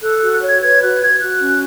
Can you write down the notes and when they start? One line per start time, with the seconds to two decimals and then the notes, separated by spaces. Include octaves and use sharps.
0.02 A4 F#6
0.17 F#4 F#6
0.32 F#6
0.42 C#5 G#6
0.62 B4 G#6
0.82 F#4 F#6
1.01 F#4 G#6
1.20 F#4 F#6
1.41 C#4